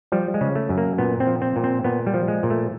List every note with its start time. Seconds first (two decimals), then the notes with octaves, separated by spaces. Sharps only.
0.12 F3 G3
0.34 G#3
0.41 C#3
0.55 A3
0.69 F#2
0.78 A#3
0.98 A#2 B3
1.20 C4
1.27 F3
1.42 C4
1.56 A#2
1.64 C4
1.84 A#2 B3
2.07 G3
2.14 F3
2.28 G#3
2.43 A#2
2.50 A3